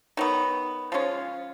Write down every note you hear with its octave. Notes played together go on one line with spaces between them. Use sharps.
D#3 F#3 B3
F3 G#3 C#4 F4